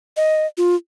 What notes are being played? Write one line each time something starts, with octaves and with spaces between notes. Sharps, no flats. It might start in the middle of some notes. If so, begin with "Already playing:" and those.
D#5
F4